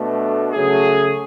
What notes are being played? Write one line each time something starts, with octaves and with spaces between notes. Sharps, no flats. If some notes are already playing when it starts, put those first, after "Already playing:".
Already playing: B2 A3 D4
C#3 F#3 A3 G#4